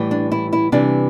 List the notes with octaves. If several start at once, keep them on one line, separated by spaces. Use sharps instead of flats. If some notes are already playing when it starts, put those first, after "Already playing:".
Already playing: A2 E3 G3
D4
E4
E4
C3 E3 G3 D4